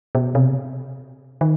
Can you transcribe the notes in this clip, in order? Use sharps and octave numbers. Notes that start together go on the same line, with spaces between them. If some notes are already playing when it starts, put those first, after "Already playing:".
B2
C3
D#3